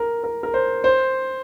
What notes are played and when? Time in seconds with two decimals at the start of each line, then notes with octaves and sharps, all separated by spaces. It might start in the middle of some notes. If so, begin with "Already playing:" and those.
Already playing: A#4
0.24 A#4
0.43 A#4
0.54 C5
0.84 C5